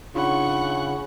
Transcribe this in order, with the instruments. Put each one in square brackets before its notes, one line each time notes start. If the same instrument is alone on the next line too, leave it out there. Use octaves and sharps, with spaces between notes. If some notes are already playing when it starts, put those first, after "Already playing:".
[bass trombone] C#3 [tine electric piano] D4 D#4 F4 [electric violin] F#5 C#6 [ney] B5